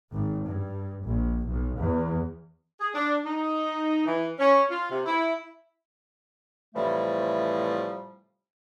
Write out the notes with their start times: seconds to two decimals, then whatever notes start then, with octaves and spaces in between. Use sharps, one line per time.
0.13 G#1
0.47 G2
1.04 A#1
1.46 B1
1.77 E2
2.80 G#4
2.94 D4
3.25 D#4
4.06 E3
4.39 C#4
4.71 F4
4.90 C3
5.05 E4
6.75 A2 C3 E3 F3 G3 A3